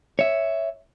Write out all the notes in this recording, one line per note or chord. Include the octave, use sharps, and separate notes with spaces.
C#5 E5